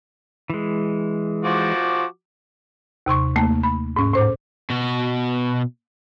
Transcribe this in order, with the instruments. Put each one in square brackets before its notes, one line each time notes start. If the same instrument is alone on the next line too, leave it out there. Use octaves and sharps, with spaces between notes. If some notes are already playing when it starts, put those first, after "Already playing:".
[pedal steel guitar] E3 G#3
[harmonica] F3 F#4 D6
[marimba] D#2 C3 C6 C#6
D#2 A3 A#3 A5
B5
G#2 C#4
A2 C5 D6
[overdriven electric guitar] B2 F#4